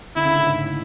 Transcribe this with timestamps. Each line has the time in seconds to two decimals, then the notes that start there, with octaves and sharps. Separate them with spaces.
0.16 D3 E4
0.25 C#3
0.36 A2
0.46 G#2